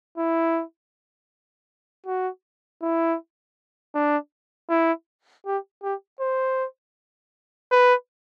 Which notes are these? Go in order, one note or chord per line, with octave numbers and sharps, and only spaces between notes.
E4
F#4
E4
D4
E4
G4
G4
C5
B4